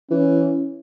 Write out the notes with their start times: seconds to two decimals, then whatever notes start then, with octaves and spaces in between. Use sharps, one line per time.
0.11 E3 C#4